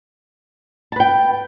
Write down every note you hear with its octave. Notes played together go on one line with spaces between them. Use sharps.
B4 G5 A5